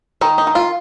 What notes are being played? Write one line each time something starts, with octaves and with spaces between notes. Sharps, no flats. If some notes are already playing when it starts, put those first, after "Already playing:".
D#3 D#4
D#4
D#3
F4